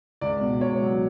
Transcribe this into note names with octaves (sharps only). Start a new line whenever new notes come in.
C#2 D5
B2
C#2 C#5
F#3